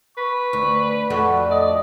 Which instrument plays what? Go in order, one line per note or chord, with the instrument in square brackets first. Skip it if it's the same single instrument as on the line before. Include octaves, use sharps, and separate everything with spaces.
[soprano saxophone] B4 [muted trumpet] C#6
[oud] D2
[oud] F2 A3 D4 [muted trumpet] F#4
[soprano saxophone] D5 [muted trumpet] D#5